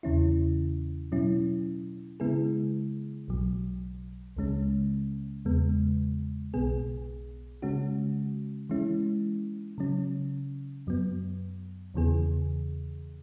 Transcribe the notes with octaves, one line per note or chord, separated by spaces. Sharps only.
E2 C#3 E3 C#4 E4
B2 F#3 C#4 E4
C#3 G#3 B3 E4 G#4
B1 B2 F#3
C#2 C#3 G#3 C#4
E2 C#3 G#3 B3
B1 B2 B3 G#4
C#3 G#3 C#4 F#4
E3 G#3 C#4 E4
C#3 F#3 C#4
F#2 F#3 B3
E2 C#3 E3 B3 G#4